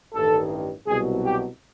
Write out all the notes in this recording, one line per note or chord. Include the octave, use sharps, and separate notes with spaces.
A1 G2 D#3 A4
C2 B2 F#3 G#4
G4